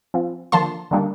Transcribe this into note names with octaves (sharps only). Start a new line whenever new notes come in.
F3 C4 F4
D3 F3 A#3 F4 A5 C6
D3 G3 A#3 D4